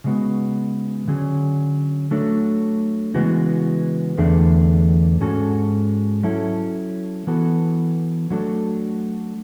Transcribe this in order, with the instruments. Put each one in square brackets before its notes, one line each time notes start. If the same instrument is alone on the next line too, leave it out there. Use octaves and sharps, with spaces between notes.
[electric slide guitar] C#3 G#3 B3 F#4
D3 F#3 C#4 G#4
F#3 A3 D4 A4
C#3 E3 G#3 B3 F#4
E2 D3 A3 D4 G#4
G#2 G#3 C#4 F#4 A4
F#3 C#4 E4 A4
E3 B3 F#4 A4
F#3 A3 D4 F#4 A4